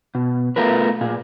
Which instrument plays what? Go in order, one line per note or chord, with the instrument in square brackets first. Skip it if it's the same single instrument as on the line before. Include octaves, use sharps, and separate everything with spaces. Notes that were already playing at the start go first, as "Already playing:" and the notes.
[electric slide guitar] B2
A3 B3 F4 A#4 B4
A#2 G#4